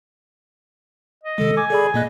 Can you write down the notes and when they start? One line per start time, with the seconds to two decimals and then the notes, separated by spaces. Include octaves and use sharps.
1.23 D#5
1.38 C3 D#3 G#3 A4
1.57 G#5 D6
1.70 G#4 A4 D5 B5
1.94 A#2 A#3 D#5 F#6